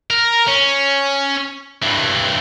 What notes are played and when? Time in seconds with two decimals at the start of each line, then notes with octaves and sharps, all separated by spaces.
0.10 A#4
0.48 C#4
1.83 G2 E3